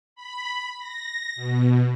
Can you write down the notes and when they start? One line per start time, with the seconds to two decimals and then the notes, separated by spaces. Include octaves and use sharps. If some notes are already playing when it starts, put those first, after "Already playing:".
0.16 B5
0.78 A#6
1.36 B2